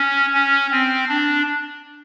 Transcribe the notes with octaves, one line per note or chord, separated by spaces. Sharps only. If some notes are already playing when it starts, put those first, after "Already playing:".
Already playing: C#4
C#4
C4
D4